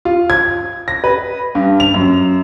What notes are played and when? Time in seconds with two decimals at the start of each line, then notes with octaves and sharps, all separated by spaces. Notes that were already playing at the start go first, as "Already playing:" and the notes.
0.05 F4
0.30 G#6
0.88 A#6
1.04 B4
1.55 G2
1.80 F7
1.94 F#2